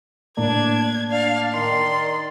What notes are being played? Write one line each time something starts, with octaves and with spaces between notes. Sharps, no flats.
A2 A#3 D4 G#6
D4 D5 F5
D#3 C6